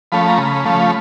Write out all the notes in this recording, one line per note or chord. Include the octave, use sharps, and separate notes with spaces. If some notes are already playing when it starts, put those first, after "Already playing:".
F3 A3 C#4 B5
A#5
C#3 B5
F3 A3 C#4 B5